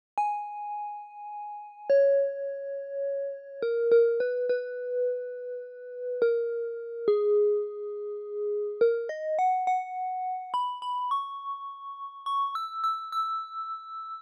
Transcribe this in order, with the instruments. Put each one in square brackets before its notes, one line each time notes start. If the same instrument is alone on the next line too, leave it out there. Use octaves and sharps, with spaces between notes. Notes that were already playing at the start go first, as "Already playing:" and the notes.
[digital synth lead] G#5
C#5
A#4
A#4
B4
B4
A#4
G#4
A#4
D#5
F#5
F#5
B5
B5
C#6
C#6
E6
E6
E6